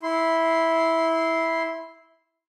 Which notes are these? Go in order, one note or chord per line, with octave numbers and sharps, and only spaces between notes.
E4 C6